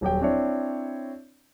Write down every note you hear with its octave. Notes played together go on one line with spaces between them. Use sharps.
D#1 F#3 G4 G5
C4 D4 E4 C#5 D5